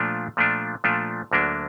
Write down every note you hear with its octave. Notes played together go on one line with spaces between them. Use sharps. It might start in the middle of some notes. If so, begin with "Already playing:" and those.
Already playing: A#2 F3 A3 D4 F4
A#2 F3 A3 D4 F4
A#2 F3 A3 D4 F4
D2 D3 F#3 A#3 D4